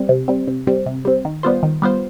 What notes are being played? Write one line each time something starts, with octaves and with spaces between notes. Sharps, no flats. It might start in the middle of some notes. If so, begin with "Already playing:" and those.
Already playing: G3 C4
C3
G3 C4
C3
G3 C4
C3
G3 C4
D#3
G3 B3 F4 C5
D#3
G3 B3 F4 C5